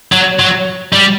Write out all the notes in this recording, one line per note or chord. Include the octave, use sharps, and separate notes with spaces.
F#3
F#3
G3